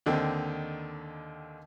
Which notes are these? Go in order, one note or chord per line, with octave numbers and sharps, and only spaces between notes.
D#2 D3 D#3 C4